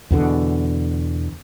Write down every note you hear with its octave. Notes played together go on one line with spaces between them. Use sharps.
E2 B2 D3